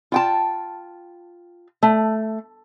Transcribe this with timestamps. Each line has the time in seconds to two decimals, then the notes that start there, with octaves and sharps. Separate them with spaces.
0.12 F4 G5 A5
1.83 A3